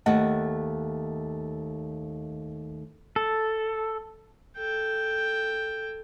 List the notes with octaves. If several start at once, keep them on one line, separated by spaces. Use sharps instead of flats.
D#2 A3 D#5 F#5 A5
A4
A4 G5